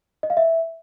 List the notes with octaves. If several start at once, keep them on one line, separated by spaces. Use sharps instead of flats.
D#5
F5
E5